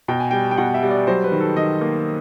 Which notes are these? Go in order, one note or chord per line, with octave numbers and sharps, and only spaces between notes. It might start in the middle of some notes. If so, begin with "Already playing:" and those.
B2 G5
G#5
G3 G5
G5
B2 F#5
E5
G3
D5
F#3 C5
B4
D#3
A4
D#3 D#5
A#3